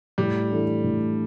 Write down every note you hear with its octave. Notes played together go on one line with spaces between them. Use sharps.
A2 G3
E3 A3 D4
A2